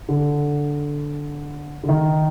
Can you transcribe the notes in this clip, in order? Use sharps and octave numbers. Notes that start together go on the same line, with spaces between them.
D3
D3
D#3